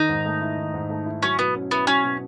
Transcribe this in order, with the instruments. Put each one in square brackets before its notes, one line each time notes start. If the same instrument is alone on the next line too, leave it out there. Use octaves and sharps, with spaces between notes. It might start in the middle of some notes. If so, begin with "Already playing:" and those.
Already playing: [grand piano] D#3 [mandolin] D#4
[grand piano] G#2
A3
E4
D#3
G#2
A3
E4
[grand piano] F#3 [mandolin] C#4
[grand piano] B2 [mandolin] B3
[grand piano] C#4
[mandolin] B3 [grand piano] E4
[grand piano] F#3 [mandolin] C#4
[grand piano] B2